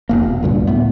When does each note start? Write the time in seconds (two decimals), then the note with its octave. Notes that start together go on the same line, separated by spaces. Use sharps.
0.09 F1 A#3
0.29 B2
0.43 D2 G2 A#2
0.67 A2 A3 B3